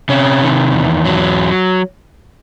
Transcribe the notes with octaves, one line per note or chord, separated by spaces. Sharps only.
C3 C#4
D#3
E2
F#3